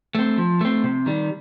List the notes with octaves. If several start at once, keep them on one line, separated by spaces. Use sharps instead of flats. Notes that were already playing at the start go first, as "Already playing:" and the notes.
A3 C4
F3
A3 C4
C3
D#3 G3